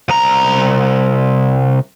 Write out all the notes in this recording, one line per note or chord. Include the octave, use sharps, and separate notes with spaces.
C2 A#5